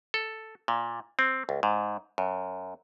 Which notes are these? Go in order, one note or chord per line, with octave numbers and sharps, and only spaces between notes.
A4
A#2
C4
C#2
G#2
F#2